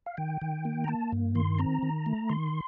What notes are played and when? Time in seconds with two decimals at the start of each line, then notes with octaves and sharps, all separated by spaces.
0.06 F5
0.17 D#3 G5
0.41 D#3
0.65 A#3
0.84 A#5
0.88 A#3 A5
1.12 G2
1.35 D#3 C6
1.59 C4 A#5
1.83 D#3
2.06 A3
2.29 D#3 C6